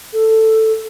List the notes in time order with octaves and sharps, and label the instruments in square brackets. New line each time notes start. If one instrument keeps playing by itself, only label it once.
[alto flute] A4